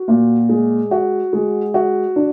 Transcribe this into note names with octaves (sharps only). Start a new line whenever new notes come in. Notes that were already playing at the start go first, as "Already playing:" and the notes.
Already playing: F#4
A#2
G#3
F#4
G#3
F#4
D4